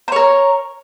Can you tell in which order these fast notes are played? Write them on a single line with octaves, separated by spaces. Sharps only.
C5 C#5 A#4